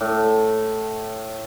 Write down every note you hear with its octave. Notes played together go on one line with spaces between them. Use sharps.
A2